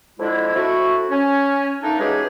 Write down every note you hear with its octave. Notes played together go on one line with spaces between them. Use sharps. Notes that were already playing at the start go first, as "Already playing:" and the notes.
F2 D3 G#3 E4
A3 C4 E4 F#4
C#4
A3 A#3 D4 D#4
E3 F#3 G#3 C#4 G4 G#4